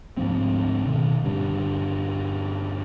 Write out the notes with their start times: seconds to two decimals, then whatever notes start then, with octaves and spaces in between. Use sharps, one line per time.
0.17 D2 G#2 F3 C4
0.86 B2 D#3
1.25 G2 A#2 D3